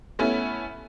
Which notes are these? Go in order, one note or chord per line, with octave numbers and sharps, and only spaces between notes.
A3 B3 C#4 E4